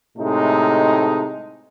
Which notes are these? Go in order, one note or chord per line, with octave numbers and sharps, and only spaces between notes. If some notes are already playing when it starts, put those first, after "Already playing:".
A2 C3 G#3 A3 D#4